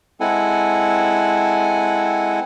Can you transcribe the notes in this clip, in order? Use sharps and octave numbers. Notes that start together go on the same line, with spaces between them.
G#3 C4 E4 A4 F#5 G#5